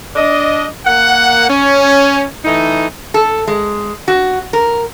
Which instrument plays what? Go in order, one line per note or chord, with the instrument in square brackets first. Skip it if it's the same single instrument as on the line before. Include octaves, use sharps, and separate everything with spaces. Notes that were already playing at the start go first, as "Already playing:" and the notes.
[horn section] D4 D#5
A#3 F#5
C#4
E3 A3 D#4
[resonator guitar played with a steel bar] A4
G#3
F#4
A#4